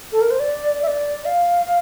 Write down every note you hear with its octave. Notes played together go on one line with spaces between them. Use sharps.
A4
A#4
C5
D5
E5
D5
F5